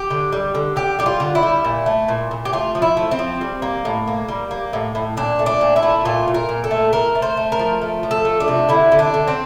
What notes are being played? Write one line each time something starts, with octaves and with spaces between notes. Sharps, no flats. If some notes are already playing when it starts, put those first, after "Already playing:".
Already playing: G4
D3
G3
D3
D3 G4
G3 G4
F4
D3
E4
G3
A#2
A3
A#2
A#2
G4
A3 F4
F3
E4
A3
C4
F3
G3
A#3
A2
A#3
G3
A#3
A2
A2
A#2 D4
A3
D4
A#2
E4
A3
A#2 F4
A#2
A#4
A#2
A4
A3
A3 A#4
A3
C5
A3
A#4
F3
A3
F3
A4
A3
D4
C3
D3 E4
D3
D4
D3
C4